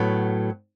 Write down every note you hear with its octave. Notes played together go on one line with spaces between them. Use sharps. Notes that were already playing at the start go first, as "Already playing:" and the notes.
Already playing: A2 F#3 B3